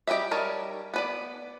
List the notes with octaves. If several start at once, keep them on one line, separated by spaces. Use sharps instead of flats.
G3 G4 B4 D#5 E5
G3 D#4 A#4 C#5 A5
B3 B4 D5